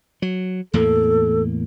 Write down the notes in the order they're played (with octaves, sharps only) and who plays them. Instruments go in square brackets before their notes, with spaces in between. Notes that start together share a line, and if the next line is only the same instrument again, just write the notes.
[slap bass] F#3
[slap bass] E2 A2 A#3 [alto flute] A4